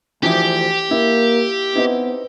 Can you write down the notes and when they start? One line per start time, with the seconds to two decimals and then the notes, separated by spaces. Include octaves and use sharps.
0.23 D2 E3 F3 E4 G4
0.91 A#3 E4
1.75 B3 C4 D#4 E4